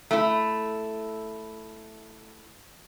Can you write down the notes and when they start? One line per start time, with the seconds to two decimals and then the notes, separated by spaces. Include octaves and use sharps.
0.11 A3 E4